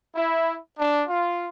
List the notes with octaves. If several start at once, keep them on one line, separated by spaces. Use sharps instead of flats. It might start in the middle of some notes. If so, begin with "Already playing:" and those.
E4
D4
F4